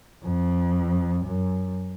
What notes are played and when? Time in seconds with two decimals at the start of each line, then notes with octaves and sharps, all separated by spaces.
0.24 F2
1.26 F#2